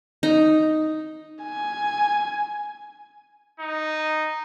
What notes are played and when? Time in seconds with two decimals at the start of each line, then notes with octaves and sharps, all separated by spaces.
0.23 D#4
1.43 G#5
3.60 D#4